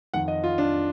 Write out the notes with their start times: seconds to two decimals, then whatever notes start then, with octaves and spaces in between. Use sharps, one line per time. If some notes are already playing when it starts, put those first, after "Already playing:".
0.14 F2 D#3 F#5
0.28 D#5
0.44 F4
0.58 D4